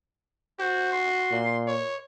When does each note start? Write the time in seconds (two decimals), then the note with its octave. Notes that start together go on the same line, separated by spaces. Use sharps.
0.60 F#4 C5
0.92 C6
1.31 A#2
1.67 C#5